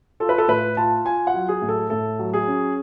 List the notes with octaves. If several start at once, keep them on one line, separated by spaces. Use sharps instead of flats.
F4 A4
B4
A4
A2 B4
F4 A5
F4 G#5
F#5
F#3
G#4
A2
A4
A2 A4
F#3
G#4
C#4